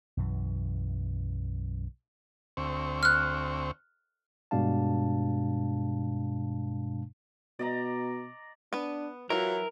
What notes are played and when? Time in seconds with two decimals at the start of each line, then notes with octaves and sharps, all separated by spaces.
0.17 B1 F#2 E3
2.57 D2 C4 C#6
3.03 F6 F#6
4.51 G2 B2 G#3 D4 F5 A5
7.59 B2 D5 D#5 A#5
8.73 B3 D4 B4
9.30 E3 F#3 E4 F4 A#4